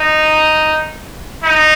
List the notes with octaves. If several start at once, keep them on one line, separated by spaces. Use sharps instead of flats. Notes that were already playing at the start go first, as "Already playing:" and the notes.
Already playing: D#4
D#4